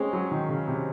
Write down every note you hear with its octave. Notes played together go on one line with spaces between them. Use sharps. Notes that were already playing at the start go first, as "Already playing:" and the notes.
Already playing: G#3 C4 C#4
F#3
D#3
C#3
C3